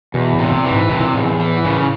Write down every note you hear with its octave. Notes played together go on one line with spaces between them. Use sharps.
E2 B2
A2
C3
A#2
E3
G#2
A2 C3
A#2
A2
E2
E3
A2 C#3